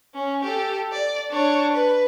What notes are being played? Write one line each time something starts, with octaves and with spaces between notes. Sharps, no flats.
C#4
G4 A4
D5
D4 C#5
B4